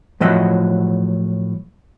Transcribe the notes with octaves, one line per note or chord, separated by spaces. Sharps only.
A2 F3 F#3 D#5 E5 F#5